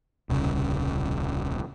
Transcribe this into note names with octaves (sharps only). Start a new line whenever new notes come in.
D#1 C2 C#3